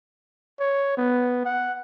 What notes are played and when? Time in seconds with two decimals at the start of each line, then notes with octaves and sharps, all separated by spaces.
0.60 C#5
0.97 B3
1.45 F#5